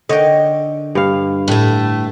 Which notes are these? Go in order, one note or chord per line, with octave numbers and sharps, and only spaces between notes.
D3 C#5 D#5 G5
G2 F5
A2 A3